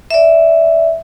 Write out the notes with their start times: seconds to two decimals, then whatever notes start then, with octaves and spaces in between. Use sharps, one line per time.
0.11 D5 E5